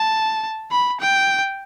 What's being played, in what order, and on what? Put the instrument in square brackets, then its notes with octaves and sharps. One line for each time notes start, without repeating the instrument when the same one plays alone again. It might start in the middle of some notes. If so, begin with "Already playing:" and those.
Already playing: [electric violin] A5
B5
G5